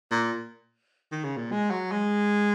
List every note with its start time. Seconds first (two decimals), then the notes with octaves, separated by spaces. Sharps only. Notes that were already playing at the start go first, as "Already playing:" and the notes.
0.11 A#2
1.12 D#3
1.24 C#3
1.37 A#2
1.52 G#3
1.71 F#3
1.91 G#3